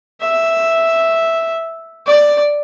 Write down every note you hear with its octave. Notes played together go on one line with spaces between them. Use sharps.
E5
D5